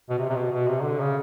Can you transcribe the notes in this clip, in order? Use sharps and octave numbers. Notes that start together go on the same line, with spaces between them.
B2
C3
C3
B2
B2
C3
D3
C#3